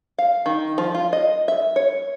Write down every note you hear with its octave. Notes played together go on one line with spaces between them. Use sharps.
F5
D#3
F3
F4
D#5
E5
C#5